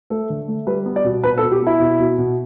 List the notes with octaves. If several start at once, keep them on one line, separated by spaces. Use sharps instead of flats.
A3 A4
D3
A3
G3 B4
B3
D5
B2
B2 B4
A4
B2
G4
B3 E4
B2
B2
B2